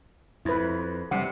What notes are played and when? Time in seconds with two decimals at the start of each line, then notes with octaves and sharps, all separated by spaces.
0.45 F2 E4 B4
1.11 C3 G3 F#5